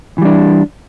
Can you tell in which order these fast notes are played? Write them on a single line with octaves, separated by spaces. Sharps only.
E3 G3 D4